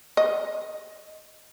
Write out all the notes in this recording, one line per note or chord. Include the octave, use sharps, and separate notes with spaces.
D#5